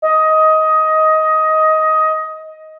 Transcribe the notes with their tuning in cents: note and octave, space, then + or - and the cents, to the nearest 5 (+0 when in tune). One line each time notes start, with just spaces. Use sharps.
D#5 +15